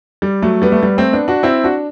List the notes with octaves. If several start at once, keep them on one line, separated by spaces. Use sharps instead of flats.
G3
F#3 A3
G3 B3
A3
G3 B3
A3 C4
B3 D4
D4 F#4
C4 E4
D4 F#4